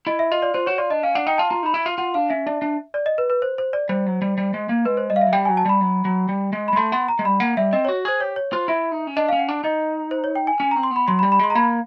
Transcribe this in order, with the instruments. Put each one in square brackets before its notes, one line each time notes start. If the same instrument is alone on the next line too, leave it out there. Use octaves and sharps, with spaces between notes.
[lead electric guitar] E4 [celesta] D#5
[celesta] E5
[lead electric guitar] F4 [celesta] D#5
[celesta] D5
[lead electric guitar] F4 [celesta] C5
[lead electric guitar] F#4 [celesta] C#5
[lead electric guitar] F4 [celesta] D5
[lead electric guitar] D4 [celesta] D#5
[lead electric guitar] C#4 [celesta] F5
[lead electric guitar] D4 [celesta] F#5
[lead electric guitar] D#4 [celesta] G5
[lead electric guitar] F4 [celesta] A5
[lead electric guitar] F4 [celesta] A#5
[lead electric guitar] D#4 [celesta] B5
[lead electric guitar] E4
F4
[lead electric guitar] F4 [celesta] F#5
[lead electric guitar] D4 [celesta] F5
[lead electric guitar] C#4 [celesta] E5
[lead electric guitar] D4
D4
[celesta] D5
D#5
B4
B4
C5
C5
D5
[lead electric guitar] G3 [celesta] C5
[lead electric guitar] F#3
G3
G3
G#3
A#3
[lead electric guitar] G#3 [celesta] B4
[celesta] C5
[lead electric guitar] G3 [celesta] D#5
[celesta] F5
E5
[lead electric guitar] F#3
[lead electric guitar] G3 [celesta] G5
[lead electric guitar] F#3 [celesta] G#5
[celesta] A5
[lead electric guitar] G3 [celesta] B5
[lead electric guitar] F#3
F#3
G3
G#3
[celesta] B5
[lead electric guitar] G#3
[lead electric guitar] A3 [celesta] C6
[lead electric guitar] B3 [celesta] C6
[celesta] A#5
[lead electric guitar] G#3
[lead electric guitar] G3 [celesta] B5
[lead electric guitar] A#3 [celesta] F#5
[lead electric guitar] G3 [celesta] E5
[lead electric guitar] C4 [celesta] D#5
[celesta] C#5
[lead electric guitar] F#4
[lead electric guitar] G#4 [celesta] C5
[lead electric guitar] G4 [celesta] C#5
[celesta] C#5
[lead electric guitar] F4 [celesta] C5
[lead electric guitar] E4 [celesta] E5
[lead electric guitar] D#4
C#4
[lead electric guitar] D4 [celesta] D#5
[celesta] F5
[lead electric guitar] C#4
[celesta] F#5
[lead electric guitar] D4
[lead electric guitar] D#4 [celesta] D#5
[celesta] C5
C#5
G5
G#5
[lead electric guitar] C#4 [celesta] G#5
[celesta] A#5
[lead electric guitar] C4
[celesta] C6
[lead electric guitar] B3
[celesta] B5
[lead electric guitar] F#3 [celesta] C6
[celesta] B5
[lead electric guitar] G3
[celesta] B5
[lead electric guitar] G#3 [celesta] C6
[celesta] A#5
[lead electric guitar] A#3 [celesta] B5